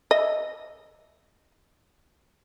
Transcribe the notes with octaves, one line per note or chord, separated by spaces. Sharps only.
D#5 E5